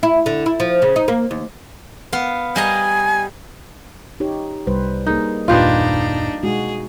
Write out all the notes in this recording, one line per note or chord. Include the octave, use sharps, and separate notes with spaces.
E4
D3
E4
F3
C#3
D#4
A#3
D#2
B3 F5
G3 D#5 G#5 A#5
D#4 G4 C#5
C2 G3 B4 C5
A#3 D#4 G#4 A#4
F#1 D#2 A#2 D4 D#4 F4 G4 B4
B2 G#3 D#4 F#4 G#4